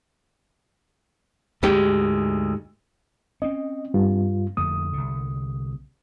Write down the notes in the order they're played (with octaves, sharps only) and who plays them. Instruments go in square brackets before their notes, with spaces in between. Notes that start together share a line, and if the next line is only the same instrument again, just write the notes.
[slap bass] D2 G#3 [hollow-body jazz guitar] G#2 G4 G5
[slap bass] C4 C#4 [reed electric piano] D#5
[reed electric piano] G2 F4
[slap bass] F2 D3 A3 [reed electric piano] D#6
[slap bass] C2 D3